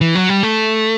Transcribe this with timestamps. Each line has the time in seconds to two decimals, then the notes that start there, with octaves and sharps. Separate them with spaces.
0.01 E3
0.15 F#3
0.29 G3
0.43 A3